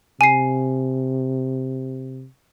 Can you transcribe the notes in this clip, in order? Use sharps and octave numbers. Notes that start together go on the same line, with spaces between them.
C3 G#5 C7